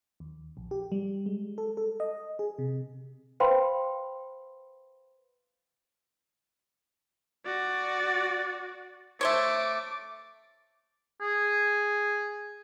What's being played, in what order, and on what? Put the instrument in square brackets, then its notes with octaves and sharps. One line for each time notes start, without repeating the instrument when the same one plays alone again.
[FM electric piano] D#2
A#1
G4
G3
G#3
A4
A4
D#5
G#4
C3
[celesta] B4 C5 F5 G5 B5 C6
[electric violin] F#4 D5
[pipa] A3 C5 C#5 [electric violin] D6
[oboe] G#4